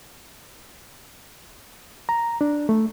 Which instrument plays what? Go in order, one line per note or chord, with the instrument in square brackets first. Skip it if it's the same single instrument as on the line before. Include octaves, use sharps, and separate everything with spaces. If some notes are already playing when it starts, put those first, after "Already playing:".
[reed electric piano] A#5
D4
A3